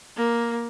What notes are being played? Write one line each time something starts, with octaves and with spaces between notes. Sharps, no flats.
A#3